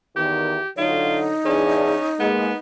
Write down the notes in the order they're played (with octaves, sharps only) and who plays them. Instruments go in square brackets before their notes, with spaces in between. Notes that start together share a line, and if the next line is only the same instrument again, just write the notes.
[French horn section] E2 D#3 [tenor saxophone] G4
[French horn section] D3 F#3 C#5 [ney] D#4 [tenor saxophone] F4
[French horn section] E2 D4 G#4 [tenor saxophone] C#4
[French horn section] G#3 A#3 [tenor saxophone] B3